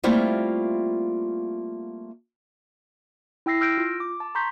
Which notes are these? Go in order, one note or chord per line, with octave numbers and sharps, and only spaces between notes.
G3 A3 A#3 C4 E4 F4
E4 G5 E6 A#6 C7
E6 F6 G6 A#6 D7
F4
D6
A5
A#5 C6 C#6 G6 B6